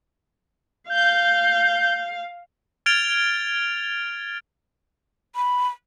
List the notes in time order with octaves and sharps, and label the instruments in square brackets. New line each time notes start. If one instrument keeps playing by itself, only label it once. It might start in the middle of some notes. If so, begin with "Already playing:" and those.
[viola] F5 [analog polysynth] G6
[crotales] F6 G#6 A6 D7 F7 G7
[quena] B5